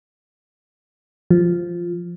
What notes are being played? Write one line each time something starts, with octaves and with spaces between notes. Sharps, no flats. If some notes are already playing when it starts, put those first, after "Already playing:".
F3